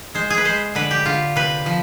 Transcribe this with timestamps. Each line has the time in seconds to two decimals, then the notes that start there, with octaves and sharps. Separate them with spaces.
0.15 G#3 C5
0.30 G#4
0.38 B4
0.45 G#3 C5
0.75 D3 B4
0.91 G4
1.06 D3 F4
1.36 C3 B4
1.66 F3